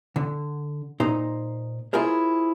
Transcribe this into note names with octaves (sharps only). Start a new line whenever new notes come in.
D3
A#2 D#4 C5
E4 F4 G#4 A#4 C5